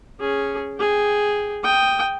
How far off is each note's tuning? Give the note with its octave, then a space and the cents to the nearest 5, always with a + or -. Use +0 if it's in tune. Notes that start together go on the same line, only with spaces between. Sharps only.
C#4 +0 G#4 +0
G#4 +0 G5 +0
G5 +0 D#6 +0